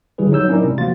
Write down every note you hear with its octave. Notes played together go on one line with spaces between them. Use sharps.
D3 G3 E4 G#4 B4
F#3 D#4 C#5 E6 G6
C4 C#4 D#4 E4 A#4 D5
C3 G#3
F3 A#3 F#4 F5 C6 A6